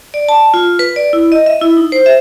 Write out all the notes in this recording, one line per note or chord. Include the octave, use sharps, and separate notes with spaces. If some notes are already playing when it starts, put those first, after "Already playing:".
D5
A5
F4
B4
D5
E4
D#5
E5
E4
D#4
C5
E5